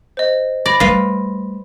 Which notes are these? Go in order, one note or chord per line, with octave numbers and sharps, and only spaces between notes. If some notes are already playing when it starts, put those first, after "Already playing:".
C5 D#5
D5 B5 A#6
G3 A3 F4 B4